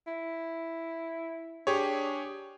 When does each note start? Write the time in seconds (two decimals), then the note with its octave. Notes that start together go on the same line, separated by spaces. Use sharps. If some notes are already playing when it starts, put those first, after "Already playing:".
0.07 E4
1.67 D4 G4 G#4 C#5